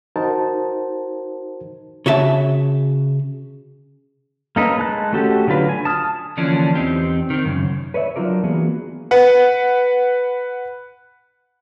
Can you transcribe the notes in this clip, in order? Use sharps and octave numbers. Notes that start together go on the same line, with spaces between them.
D#4 F#4 A#4 C5 A5
C#3 F#4 E5 A5
A#3 C#4 D#4 A4 B4
G#3 A5 F#6
A3 C#4 F#4 G4 A4
D3 F#3 D4 F4 B4
G#5
A5 D#6 F6
D3 E3 F3 A#3 C#4 D4
E2 C4 D#4 G4
D#3 C4
F#2 C#3
B4 C#5 D5 E5
F#3 D4 D#4 F4 A#4 D5
E3 A#3 B3 F#4 G#4 A#4
B4 F#5